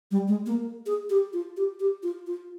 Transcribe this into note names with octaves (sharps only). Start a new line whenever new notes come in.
G3
G#3
A#3
G#4
G4
F4
G4
G4
F4
F4